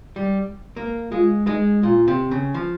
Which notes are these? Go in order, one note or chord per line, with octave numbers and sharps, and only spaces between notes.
G3
A#3
G#3 F4
G#3 D#4
A#2 F4
C3
C#3
F3